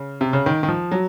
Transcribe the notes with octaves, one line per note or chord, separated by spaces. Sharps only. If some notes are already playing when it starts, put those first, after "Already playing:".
Already playing: C#3
C3
C#3
D#3
D#3
F3
F#3